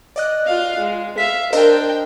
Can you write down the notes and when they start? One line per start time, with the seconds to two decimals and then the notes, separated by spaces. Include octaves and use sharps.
0.16 D5 D#5 F#6
0.46 F4 F5
0.79 G#3
1.18 E5 F5 B6
1.53 D4 A#4 C5 D#5 G5